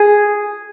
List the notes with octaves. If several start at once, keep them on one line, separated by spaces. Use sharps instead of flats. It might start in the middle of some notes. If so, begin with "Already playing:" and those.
Already playing: G#4